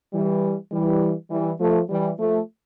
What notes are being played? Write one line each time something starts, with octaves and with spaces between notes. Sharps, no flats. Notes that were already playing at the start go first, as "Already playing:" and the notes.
E3 G3
E3 G3
E3 G3
F3 A3
E3 G3
F3 A3